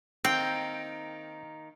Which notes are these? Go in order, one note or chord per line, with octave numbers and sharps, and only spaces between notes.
D#3 A#3 C4 G5